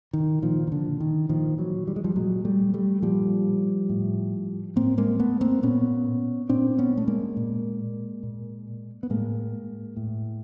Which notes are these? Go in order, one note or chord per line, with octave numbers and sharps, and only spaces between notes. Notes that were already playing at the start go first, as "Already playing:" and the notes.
D#3
A#2 D#3 F3
D#3
D3
D#3
A#2 D#3 F3
E3 F#3
G3
G#3
F3 G3
A#2 F#3 G#3
G3 A3
G3 A3
A#2 F3 G3
A2
A2 A#3 C4
G#3 A#3
A3 B3
A#3 C4
A#2 B3 C#4
A#2 C4 D4
B3 C#4
A3
G#3 A#3
A#2
A#2
B3
A2 G#3 A#3
A2